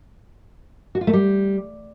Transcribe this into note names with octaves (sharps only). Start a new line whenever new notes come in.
F#4
F4
A3
G3